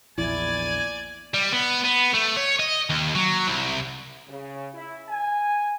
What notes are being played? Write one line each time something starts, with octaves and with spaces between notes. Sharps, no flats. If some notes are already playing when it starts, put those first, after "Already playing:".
A#1 E2 E4 D5 G#5
G3
B3
B3
A3
C#5
D#5
D#2
F#3
C2
C#3
E4
G#5